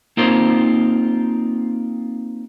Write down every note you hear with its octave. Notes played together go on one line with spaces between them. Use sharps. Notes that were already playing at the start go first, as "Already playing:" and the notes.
A#3 C4 D#4 F4 G4 C5